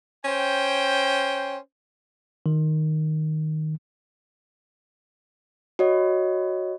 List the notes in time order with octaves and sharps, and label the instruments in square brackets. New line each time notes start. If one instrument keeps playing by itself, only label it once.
[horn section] C#4 C5 G5
[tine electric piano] D#3
[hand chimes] F#4 C#5 D#5